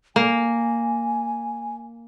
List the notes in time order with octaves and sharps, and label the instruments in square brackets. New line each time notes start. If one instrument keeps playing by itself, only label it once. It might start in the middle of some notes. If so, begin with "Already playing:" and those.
[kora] A#3 [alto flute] G#5